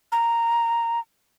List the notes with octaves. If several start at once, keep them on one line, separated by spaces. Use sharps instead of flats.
A#5